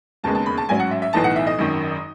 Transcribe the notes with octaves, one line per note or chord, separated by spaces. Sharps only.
E1 D#2 C#3 G#3 B3 A5
A5
B5
A5
A1 G#2 F#3 C#4 G#5
F#5
E5
E5
B1 A2 E3 B3 D#4 A5
F#5
E5
D#5
G#1 F#2 D#3